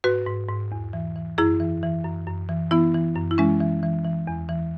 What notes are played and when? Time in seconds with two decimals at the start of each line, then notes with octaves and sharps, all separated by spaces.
0.04 G#2 F#4 B4
0.27 G#2
0.49 G#2
0.72 E2
0.93 E3
1.16 E3
1.38 F#2 E4 G#4
1.60 E3
1.83 E3
2.04 F#2
2.27 F#2
2.49 E3
2.71 E3 B3 E4
2.94 E3
3.16 F#2
3.31 E4
3.38 E3 G#3 C#4
3.61 E3
3.83 E3
4.05 E3
4.27 E2
4.49 E3